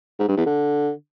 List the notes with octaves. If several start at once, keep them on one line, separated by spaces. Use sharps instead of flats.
G#2
G2
E2
D3